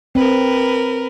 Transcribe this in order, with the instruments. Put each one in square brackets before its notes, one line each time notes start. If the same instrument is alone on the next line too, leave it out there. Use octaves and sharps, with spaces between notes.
[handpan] C4 [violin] A#4 B4